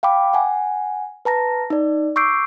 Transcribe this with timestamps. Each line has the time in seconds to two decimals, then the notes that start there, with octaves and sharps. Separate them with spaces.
0.03 F5 G5 B5 D6
0.34 F#5 G#5
1.25 B4 A5 A#5 A#6
1.70 D#4 D5
2.16 C#6 D6 E6 G6 C7 D7